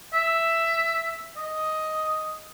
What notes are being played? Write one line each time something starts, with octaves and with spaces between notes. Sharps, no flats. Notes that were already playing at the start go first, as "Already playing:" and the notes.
E5
D#5